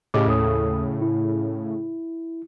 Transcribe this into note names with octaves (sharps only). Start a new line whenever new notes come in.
A2 C#3 G4 D#5 D6
D#2 A4 D#6
E4